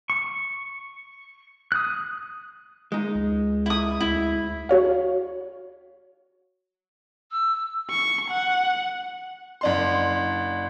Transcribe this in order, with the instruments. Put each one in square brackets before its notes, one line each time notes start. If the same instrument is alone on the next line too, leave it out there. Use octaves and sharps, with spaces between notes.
[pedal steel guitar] C#6
D#6 F#6
[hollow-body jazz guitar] G#3 D#4
[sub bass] C#2
[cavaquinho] E4 D#6
[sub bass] D2 [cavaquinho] E4
[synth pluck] F#4 C#5 F5
[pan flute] E6
[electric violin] C#6
F#5
[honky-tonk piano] F#1 D4 C6